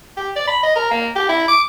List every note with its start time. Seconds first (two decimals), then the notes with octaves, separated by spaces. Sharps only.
0.17 G4
0.36 D5
0.48 B5
0.63 D#5
0.76 A#4
0.91 A#3
1.16 G4
1.29 E4
1.48 D6